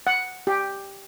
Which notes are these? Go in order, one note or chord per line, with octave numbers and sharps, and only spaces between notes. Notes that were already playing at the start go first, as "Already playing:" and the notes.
F#5
G4